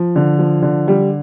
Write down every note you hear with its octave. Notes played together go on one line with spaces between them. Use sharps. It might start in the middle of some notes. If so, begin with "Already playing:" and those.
Already playing: F3
D3
F3
D3
G3